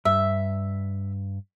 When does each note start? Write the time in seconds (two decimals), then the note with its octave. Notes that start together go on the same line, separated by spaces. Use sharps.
0.05 G2 E5